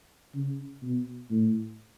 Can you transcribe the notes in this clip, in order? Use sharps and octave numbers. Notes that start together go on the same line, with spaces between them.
C#3
B2
A2